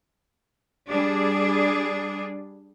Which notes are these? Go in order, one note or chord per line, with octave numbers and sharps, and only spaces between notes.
G3 D4 G#4